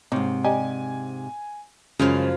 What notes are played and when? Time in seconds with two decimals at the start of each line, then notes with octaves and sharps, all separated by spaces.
0.12 G#2 C3 A#3 C#4 D#4
0.45 D4 D#4 G4 G#5
1.99 F#2 C#3 F3 G#3 F4